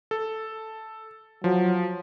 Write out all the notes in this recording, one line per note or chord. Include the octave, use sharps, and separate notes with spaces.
A4
F3 F#3